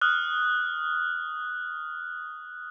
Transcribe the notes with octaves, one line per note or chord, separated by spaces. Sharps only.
D#6 F6 F#6